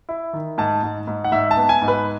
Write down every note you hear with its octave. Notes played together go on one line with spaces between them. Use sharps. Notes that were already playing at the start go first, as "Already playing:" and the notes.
E4
D#3
G#2 A5
G#2
G#2
F#5
G#2 E5
A5
B3
G#5
G#2
B4